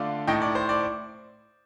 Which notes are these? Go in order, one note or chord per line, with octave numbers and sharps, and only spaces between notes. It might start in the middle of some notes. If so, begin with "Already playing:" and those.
Already playing: D3 A3 D4 F4 D5 F5
A2 A3 D#4 D#5 G5
D5
C5
D5